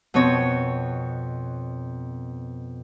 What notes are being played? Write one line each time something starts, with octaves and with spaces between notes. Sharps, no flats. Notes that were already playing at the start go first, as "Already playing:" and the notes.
F2 B2 C4 C#5